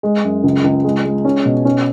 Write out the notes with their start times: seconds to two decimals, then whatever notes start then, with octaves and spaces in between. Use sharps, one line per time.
0.03 G#3
0.24 F#2
0.44 C#2
0.64 C#2
0.84 G#3
1.05 G#3
1.25 C#4
1.45 B2
1.65 C#4